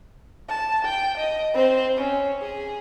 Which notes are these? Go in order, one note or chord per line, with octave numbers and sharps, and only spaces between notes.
A5
G5
D#5
C4 C5
C#4
G#4